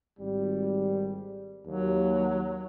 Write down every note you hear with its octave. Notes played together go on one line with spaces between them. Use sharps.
G#1 G3
D#2 F#3